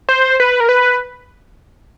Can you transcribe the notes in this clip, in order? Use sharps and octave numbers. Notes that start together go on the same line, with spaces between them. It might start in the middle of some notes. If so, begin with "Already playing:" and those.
C5
B4
A#4
B4